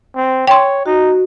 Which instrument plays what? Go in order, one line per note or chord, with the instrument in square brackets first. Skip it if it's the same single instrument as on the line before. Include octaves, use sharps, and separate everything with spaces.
[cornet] C4
[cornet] C#5 [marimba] G5 C6
[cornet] D#4 [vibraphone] F#4